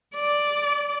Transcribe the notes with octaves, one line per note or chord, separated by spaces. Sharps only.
D5